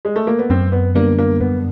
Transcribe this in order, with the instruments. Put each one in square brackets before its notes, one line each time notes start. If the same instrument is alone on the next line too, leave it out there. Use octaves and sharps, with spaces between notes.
[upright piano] G#3
A3
A#3
B3
[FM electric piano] F#2 [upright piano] C4
[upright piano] B3
[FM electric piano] D3 G3 B3 D4 [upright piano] A#3
[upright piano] A#3
[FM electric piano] F#2 [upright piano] B3